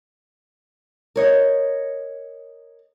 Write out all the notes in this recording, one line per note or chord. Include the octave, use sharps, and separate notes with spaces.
A#4 C#5 D#5